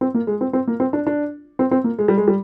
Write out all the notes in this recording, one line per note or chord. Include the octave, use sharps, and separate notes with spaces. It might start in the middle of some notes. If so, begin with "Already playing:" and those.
C4
A#3
G#3
C4
C4
A#3
C4
D4
D4
C4
C4
A#3
G#3
G3
G#3
G3